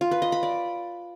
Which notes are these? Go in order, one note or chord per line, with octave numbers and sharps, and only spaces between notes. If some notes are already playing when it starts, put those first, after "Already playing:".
F4
B4
D#5
B5
D5